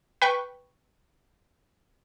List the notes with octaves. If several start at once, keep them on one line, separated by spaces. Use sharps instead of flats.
B4 G5 C#6